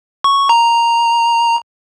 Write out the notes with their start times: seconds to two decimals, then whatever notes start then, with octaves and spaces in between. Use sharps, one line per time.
0.24 C#6
0.49 A#5